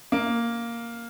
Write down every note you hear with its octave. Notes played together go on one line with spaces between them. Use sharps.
A#3